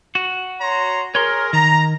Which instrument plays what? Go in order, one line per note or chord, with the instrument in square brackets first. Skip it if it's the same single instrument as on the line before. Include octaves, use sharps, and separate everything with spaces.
[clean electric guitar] F#4
[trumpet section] C#5 A#5 C6
[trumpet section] G#4 A#4 [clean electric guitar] C#5 C6
[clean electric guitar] D#3 [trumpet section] A#5